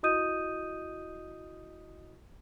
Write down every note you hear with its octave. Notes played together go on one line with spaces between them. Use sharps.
E4 F#4 D#5 D#6 G6 D#7